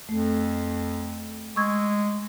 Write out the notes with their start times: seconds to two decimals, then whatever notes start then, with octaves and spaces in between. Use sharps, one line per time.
0.09 F2 A3
1.56 G#3 C#6 E6 G#6